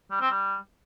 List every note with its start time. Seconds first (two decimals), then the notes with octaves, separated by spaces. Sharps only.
0.11 G3
0.21 C4
0.31 G3